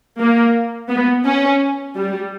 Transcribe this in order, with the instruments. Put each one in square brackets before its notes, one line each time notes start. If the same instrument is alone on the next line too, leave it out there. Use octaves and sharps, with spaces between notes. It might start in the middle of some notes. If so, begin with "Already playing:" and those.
[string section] A#3
B3
C#4
G3